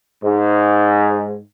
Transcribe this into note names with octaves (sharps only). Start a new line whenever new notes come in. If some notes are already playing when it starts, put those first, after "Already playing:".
G#2